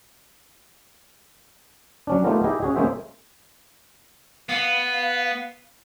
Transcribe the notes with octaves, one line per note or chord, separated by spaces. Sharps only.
F#3 C#4 D4
A3 B3 D#4 F4 G4 A#4
D#4 E4 G4 G#4 D#5
C#4 F#4 G#4
G#3 A#3 C#4 G#4 C5 E5
B3 F5